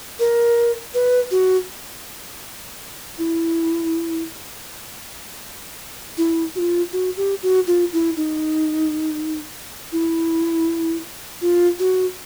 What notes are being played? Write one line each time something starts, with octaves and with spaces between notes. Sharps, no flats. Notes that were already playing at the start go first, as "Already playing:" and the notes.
A#4
B4
F#4
E4
E4
F#4
F4
F#4
G4
F#4
F4
E4
D#4
E4
F4
F#4